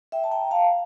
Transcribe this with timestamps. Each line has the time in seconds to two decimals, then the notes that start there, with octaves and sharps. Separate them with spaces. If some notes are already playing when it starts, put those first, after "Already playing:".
0.12 E5 G5
0.24 A5
0.31 G5 A#5
0.51 F5 A5